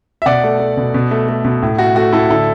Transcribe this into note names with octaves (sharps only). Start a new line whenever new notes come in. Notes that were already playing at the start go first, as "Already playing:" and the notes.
E5
B2 D5 F#5
A3
A3
B2
B2
A3
A3
B2
A2
A3 F#4
A3 F#4
A2 E4 A4
D3 E4 A4